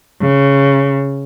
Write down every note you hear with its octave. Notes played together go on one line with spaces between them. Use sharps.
C#3